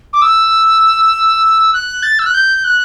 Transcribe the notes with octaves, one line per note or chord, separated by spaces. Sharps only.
D6
E6
F#6
A6
E6
F#6
G6
F#6